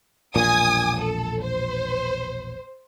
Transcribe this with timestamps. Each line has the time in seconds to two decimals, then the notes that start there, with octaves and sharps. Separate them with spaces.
0.36 E1 A#1 A#2 G#5 D#6
0.99 A4
1.43 C5